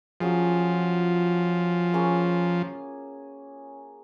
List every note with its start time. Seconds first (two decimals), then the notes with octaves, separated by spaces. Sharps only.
0.21 F3 F#3 C#4 F4 G#4
1.94 A#3 C#4 G#4 C#5